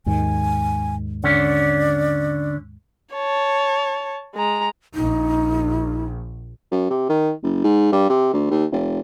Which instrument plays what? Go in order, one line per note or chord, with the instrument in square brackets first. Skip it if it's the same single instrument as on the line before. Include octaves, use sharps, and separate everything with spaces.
[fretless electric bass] D#2 G#2 D#3 [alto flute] G#5
[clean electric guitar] D3 C#4 [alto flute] D5
[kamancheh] C#5 A5
G#3 A#5
[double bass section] A#1 [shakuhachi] D#4
[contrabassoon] F#2
C3
D#3
F#1
G#2
G2
C3
D2
D#2
F1